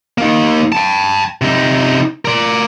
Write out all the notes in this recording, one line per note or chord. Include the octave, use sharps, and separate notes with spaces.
A#3 D#4
G5 A5
C3 D#4
A#4 D5